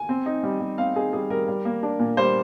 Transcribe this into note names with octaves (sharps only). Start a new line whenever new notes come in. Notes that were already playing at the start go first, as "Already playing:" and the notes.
Already playing: G#5
C4
D#4
G3
G3
C4 F5
D#4 G#4
G3 G#4
G3 A#4
G3
A#3
D4
A#2
G3 C5